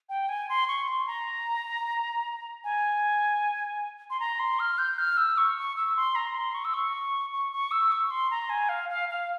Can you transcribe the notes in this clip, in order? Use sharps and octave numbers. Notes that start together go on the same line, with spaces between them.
G5
G#5
C6
C#6
C6
A#5
G#5
C6
A#5
C6
F6
G6
F6
E6
C#6
C#6
E6
C6
A#5
C6
C#6
E6
C#6
C#6
C#6
E6
C#6
C6
A#5
G#5
F5
F5
F5